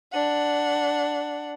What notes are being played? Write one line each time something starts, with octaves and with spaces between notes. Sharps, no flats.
D4 F#5